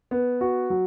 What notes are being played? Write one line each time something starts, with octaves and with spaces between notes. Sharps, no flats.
B3
F#4
F#3